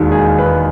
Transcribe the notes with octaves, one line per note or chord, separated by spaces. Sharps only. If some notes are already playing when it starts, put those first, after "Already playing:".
Already playing: E1 D#2 D#3 G#3
G#4
B4